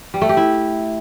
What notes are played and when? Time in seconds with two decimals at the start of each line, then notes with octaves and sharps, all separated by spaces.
0.14 G3
0.22 A3
0.29 G4
0.37 E4